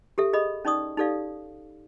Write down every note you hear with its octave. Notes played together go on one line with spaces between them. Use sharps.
G4 A4 E5
G#4 D#5 B5 D#6
C#4 D#4 D5 C#6 D#6
D#4 G4 A4 D5 F5